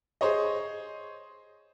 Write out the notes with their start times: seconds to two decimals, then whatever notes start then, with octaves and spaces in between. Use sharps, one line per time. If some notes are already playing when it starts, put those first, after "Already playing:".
0.21 G#4 C5 C#5 D#5